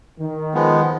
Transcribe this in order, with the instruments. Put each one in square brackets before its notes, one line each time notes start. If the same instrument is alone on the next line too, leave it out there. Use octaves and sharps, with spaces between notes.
[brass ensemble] D#3
[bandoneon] F3 G#3 B3